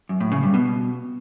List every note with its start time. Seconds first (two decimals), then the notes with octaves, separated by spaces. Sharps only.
0.09 F#2
0.20 A2
0.32 C#3
0.43 G2
0.54 B2